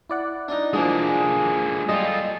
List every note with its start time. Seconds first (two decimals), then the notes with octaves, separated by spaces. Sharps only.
0.10 E4 D5 F#5
0.48 D4 D#4
0.73 F3 G#3 A#3 D4 G#4
1.89 G3 F4 A4 D#5